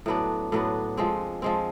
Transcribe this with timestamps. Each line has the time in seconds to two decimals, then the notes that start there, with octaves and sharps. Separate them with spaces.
0.06 A2 F#3 B3 D4
0.52 A2 F#3 B3 D4
0.97 F3 G#3 C4
1.42 F3 G#3 C4